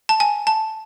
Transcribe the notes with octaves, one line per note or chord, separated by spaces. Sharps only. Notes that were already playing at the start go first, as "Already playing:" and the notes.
A5
G#5
A5